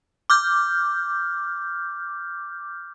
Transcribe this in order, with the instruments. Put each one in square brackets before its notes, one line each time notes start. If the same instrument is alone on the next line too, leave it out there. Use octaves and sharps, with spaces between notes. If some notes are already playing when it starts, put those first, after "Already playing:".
[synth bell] D6 F6 G6